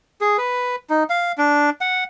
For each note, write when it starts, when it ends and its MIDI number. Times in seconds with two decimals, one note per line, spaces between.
0.21 0.37 68
0.38 0.76 71
0.90 1.04 63
1.10 1.32 77
1.38 1.70 62
1.81 2.04 78